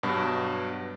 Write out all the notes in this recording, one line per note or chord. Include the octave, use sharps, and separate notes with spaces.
G2 B2 F#3